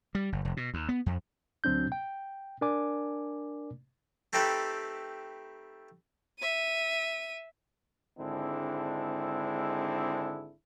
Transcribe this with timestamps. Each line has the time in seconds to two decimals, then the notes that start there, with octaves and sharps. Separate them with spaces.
0.15 G3
0.32 G1
0.45 F1
0.57 B2
0.74 D#2
0.89 B3
1.06 F2
1.64 D2 F#3 C4 D4 G6
1.92 G5
2.61 D4 A#4 D5 G#5 D6
4.33 A3 C4 D#4 G4 A4 B4
6.40 E5 D#7
8.19 G#1 D3 G#3 C4 D4 E4